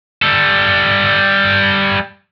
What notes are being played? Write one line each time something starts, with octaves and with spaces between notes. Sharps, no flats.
G3 A4